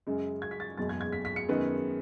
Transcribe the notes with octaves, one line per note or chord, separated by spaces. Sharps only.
F#2 C#3 G#3
G#6
B6
A6
F#1 E2 B2 G#3 A6
G#6
G#6
B6
B6
C#7
F#2 D#3 G#3 B3